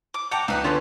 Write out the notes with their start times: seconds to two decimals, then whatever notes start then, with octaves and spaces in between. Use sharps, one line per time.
0.14 D6
0.31 F#5 G5 A5 A#5 D6 G6
0.48 C#2 D#4 B4 D5
0.64 D3 B3 C#4 F4 G#4 A4